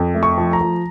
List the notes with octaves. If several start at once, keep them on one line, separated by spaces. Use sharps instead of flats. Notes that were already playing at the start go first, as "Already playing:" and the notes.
Already playing: F2
A3
C#6
F3
A#5
F3